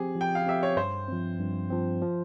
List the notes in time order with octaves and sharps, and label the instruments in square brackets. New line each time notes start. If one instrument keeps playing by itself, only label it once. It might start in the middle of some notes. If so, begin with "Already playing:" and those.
Already playing: [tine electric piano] F3 C4 G4 [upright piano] G#4
[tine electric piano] F3
[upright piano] G5
F5
[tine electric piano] C4 G4 [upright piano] E5
[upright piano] C#5
[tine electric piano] G2 [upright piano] C5
[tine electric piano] F3 C4
G2
F3 C4
F3